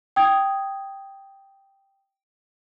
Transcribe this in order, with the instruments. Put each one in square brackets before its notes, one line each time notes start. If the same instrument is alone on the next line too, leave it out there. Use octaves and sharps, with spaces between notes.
[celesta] G5 D#6 G#6